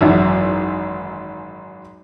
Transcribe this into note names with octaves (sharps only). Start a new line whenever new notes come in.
G#1 F#2 E3